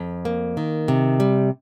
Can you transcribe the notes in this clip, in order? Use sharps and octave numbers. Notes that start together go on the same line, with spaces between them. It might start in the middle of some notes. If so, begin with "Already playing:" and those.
Already playing: F2
A#3
D#3
C3
G3